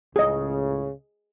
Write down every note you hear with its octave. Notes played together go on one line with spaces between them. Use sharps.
C#2 A2 C#3 G#4 D#5